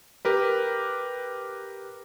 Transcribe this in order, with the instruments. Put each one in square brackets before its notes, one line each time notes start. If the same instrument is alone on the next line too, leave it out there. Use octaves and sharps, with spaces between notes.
[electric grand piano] G4 A#4 B4